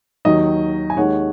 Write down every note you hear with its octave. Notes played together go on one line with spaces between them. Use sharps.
D#2 D#3 F#3 D#5
G#5
D#2 D#3 G#3 C#5 F#5